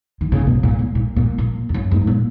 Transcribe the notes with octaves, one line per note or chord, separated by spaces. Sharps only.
D#3
C#3
B2
A#2
G#2
A#2
A#2
A#2
F2
F#2
G#2
A#2